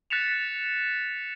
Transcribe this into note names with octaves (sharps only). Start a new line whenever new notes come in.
F#6 A6 B6 C#7 E7 F7